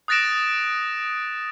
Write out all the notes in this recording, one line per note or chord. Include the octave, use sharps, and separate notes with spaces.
D#6 F#6 A6 A#6 D7 E7